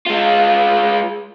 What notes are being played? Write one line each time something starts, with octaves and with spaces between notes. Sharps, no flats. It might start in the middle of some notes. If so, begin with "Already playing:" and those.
G#3 F4